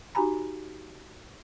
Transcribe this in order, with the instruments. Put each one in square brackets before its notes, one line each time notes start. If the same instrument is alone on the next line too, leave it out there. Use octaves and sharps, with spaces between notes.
[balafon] D#4 F#4 G4 G#5 A#5 B5